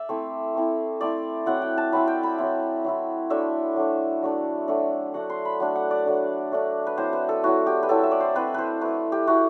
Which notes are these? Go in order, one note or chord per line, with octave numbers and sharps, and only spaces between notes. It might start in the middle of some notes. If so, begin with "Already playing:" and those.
Already playing: D5 E5
A3 C4 E4
A3 C4 E4
A3 C4 E4 D5
F#3 C4 E4 F#5
G5
A5
F#3 C4 E4 B5
G5
B5
F#3 C4 E4
F#3 C4 E4
F#3 A3 D4 E5
F#3 A3 D4
F#3 A3 D4
F#3 A3 D4
F#3 A3 D4 F#5
C6
B5
F#3 A3 D4
F#5
D5
F#3 A3 D4
F#3 A3 D4
B4
F#3 C4 E4 C5
B4
A4
F#3 C4 E4 F#4
G4
B4
F#3 C4 E4 A4
E5
D5
C5
F#3 C4 E4 B4
B4 C5
A3 E4 B4
G4
A3 E4 F#4